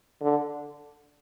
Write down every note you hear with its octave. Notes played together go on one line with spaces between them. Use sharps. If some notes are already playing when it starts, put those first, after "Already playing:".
D3